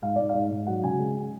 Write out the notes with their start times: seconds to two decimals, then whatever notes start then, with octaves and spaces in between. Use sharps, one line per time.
0.02 G#2 F5
0.16 G#2 D5
0.29 G#2 F5
0.51 G#2
0.66 F#3 F#5
0.83 C#3 G#5
0.99 G#3